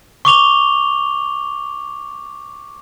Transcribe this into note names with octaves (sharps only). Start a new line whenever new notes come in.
C#6 D6 F7 G7